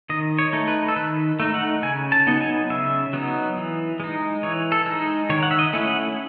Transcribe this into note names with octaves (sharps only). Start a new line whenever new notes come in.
D#3 D#5
C#5
A3 D#4
B4
A4
D#3 B4
A3 D#4
F#5
C#3 G#5
A5
F#3 B3 D#4
G#5
C#3 E5
F#3 B3 D#4
E3
G#3 D#4
E3 C#5
A4
G#3 D#4
D#3 C#5
F#5
E5
D#5
A3 C#4 E4
F#5